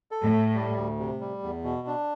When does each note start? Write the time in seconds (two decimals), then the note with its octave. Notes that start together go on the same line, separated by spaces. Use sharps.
0.11 A4
0.22 A2
0.33 A3
0.54 G3
0.76 D2
0.99 C3
1.20 G3
1.43 E2
1.64 B2
1.87 D4